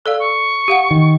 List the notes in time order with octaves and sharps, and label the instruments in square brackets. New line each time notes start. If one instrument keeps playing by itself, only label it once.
[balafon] A4 D5 F5 [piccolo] E6
[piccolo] C#6
[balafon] G4 F5 F#5
[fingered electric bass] D#3